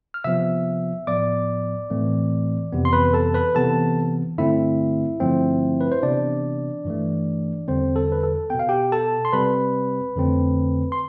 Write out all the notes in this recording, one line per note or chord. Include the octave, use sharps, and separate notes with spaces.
F6
C3 F3 B3 E5 E6
A2 F3 B3 D5 D6
A2 E3 A3 C4
F2 C3 E3 B3
C6
B4 B5
A4 A5
B4 B5
C3 E3 B3 A4 A5
G2 D3 A3 C4 E4 E5
G2 D3 F3 A3 C4
B4
C5
C3 E3 B3 D4 D5
G2 E3 A3
E2 D3 G3 C4 C5
A4
B4
A4
B2 B3 G5
F5
G4 G5
A4 A5
C6
C3 G3 C4 B4 B5
F2 D3 A3 C4
C6